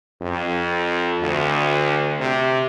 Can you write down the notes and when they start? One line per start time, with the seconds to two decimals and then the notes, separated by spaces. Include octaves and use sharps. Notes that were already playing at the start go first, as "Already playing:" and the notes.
0.22 F2
1.22 D2
2.21 C3